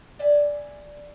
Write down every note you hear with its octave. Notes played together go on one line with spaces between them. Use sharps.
D5 E5 G#5